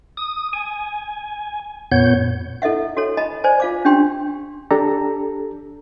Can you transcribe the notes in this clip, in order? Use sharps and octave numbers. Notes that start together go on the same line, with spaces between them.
D#6
G#5
F2 A#2 B3 C#5 G6
E4 A4 D#5 E5 F#5
F#4 A4 C#5
D#5 A5 B5
C5 D5 G#5 A5
F4 F5 D6
C#4 D4 G4 G5 C6
D4 G4 A4 A#5